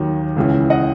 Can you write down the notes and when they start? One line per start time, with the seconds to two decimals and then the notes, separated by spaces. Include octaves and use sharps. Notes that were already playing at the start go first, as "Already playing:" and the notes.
Already playing: D#2 D#3 F#3
0.36 C#2 C#3 E3
0.70 D#5 F#5